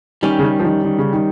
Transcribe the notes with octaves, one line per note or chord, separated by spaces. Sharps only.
D#3 G3 C#4 G4
C#3
D#3
F3
D#3
D#3
C#3
D#3